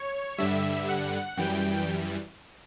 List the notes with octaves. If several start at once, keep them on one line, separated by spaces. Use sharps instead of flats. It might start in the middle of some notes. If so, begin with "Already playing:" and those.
Already playing: C#5
G2 D3 G3 E5
F#5
F#2 E3 G3 G5